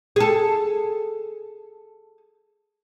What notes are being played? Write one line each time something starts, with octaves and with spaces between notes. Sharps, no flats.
G#4 A4